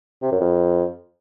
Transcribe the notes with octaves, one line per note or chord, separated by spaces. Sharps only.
C3
F#2
F2